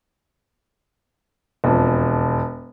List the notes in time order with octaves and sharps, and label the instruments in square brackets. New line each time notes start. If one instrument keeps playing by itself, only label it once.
[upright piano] E1 F2